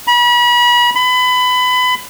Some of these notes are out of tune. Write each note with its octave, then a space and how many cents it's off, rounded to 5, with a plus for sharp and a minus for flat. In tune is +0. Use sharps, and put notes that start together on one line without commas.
B5 -35
B5 +25